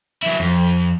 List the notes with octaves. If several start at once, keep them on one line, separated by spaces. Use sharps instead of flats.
F#3 E4
F2